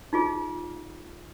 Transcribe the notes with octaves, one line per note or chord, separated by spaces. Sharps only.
D#4 F4 G#4